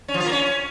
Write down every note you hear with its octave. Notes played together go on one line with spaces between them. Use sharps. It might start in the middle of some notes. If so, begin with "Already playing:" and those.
C#4
F3
F4
A#3
C#4